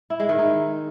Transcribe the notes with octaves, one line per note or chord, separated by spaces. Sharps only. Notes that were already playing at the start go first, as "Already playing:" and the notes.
E4
G#3
D#3
D#4